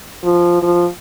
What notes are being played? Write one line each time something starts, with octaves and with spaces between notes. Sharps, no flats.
F3
F3